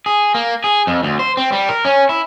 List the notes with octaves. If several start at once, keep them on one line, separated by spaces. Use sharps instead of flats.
G#4
A#3
G#4
F2
D2
C5
C4
G3
A#4
C#4
E4